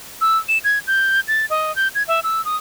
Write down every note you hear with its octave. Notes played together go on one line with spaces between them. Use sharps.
E6
E7
G#6
G6
A6
D#5
G6
G#6
E5
E6
D#6